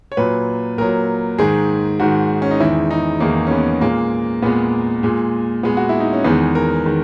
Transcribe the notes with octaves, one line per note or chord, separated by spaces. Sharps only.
C#5
A#2 F#3 B4
A#2 F#3 A#4
G#2 D#3 G#3 G#4
G#2 D#3 G#3 F#4
C#4
D#4
E2 D#3 G#3 E4
D#4
E2 D#3 G#3 A#3
C#4
B3
A#2 G#3 A#3
A#2 G#3 B3
A#2 G#3
A#2 G#3 B3
F#4
E4
D#4
C#4
E2 D#3 G#3 B3
A#4
D#3 G#3